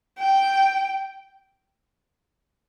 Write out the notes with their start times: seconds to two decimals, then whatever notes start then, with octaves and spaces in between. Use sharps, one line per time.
0.19 G5